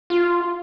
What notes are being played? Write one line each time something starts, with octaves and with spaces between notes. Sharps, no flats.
F4